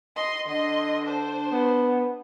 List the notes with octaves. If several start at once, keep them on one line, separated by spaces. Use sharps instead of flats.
D#5 C6
D3 D#5 C6
D4 C5
B3